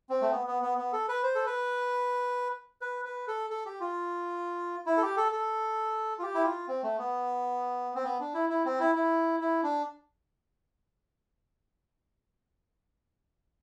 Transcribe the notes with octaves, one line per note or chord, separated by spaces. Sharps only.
C4
A3
B3
B3
B3
B3
A4
B4
C5
A4
B4
B4
B4
A4
A4
G4
F4
E4
A4
G4
A4
A4
F4
G4
E4
F4
C4
A3
B3
C4
B3
D4
E4
E4
C4
E4
E4
E4
D4